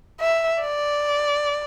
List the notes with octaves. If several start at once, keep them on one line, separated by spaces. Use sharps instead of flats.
E5
D5